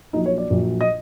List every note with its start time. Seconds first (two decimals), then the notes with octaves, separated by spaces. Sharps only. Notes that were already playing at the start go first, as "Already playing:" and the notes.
0.13 A#1 A#2 F#3 D#4 D#5
0.26 C#5
0.38 D5
0.50 A#1 A#2 F#3
0.81 D#5